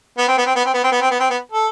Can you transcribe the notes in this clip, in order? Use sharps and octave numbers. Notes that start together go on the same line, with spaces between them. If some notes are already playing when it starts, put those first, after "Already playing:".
B3
C4
B3
C4
B3
C4
B3
C4
B3
C4
B3
C4
B3
A4